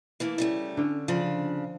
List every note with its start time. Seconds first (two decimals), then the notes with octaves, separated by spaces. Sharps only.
0.20 E3 A3 A#3
0.38 C#3 G3 A3
0.77 D3 C#4
1.08 C#3 F3 D4